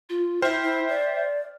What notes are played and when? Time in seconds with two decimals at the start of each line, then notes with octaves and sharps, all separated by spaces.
0.09 F4
0.42 E4 C5 E5 G5 F6
0.63 E4
0.89 D5